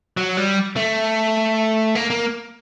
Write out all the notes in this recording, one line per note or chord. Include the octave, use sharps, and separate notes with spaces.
F#3
G3
A3
A#3
A#3